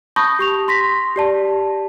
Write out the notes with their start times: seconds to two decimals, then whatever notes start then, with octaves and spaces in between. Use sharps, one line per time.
0.16 A5 B5 C#6 D#6 G6 A#6
0.39 G4 C#6 F7
0.68 C6 A#6 B6
1.16 G4 D5 A5